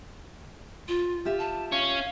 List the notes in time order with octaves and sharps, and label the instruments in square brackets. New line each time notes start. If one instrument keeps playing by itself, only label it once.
[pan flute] F4
[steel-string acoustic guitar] F4 G4 E5
[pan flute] A5
[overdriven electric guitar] C#4 [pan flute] F5